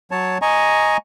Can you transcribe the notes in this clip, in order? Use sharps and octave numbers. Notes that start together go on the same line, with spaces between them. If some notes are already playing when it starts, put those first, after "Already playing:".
F#3 C#5 A5
D#5 G#5 A#5 C#6